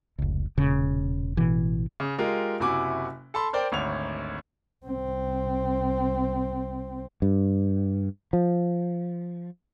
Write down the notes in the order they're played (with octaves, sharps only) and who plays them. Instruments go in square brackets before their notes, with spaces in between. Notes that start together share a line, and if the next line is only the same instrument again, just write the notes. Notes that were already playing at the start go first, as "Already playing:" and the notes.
[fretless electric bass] F1 C#2
E1 A#2 C#3
A1 B2 E3
[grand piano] C#3
G#3 F4 G4 A#4
F#1 C3 E4 F#4 G#5 D6
A4 A5 B5 C6
A#4 C5 D5 G5
G#1 D2 C#5 F7
[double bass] C2 C4
[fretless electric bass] G2
F3